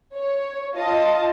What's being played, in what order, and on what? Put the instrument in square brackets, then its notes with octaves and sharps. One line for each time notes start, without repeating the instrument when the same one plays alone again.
[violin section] C#5
F4 D#5 A5